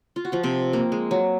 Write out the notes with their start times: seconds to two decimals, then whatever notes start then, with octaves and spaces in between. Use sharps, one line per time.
0.16 F4
0.25 F#4
0.32 F3 F4
0.43 C3 C4
0.73 A#3
0.92 G#3
1.11 F#3